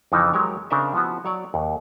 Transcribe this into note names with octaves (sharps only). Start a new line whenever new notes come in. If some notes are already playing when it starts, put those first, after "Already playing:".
F2 C#3 E3 F3 D#4
F#3 G#3 G4 A#4 C#5
C#3 C4 D4 A#4 D#5 E5
F3 B3 E4 F#4
F#3 C#5 D5
D#2